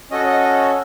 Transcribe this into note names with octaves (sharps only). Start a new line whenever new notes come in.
C#4 F#4 A4 D#5
D#5
D#5